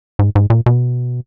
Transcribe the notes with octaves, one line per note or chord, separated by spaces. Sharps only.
G#2
G#2
A#2
B2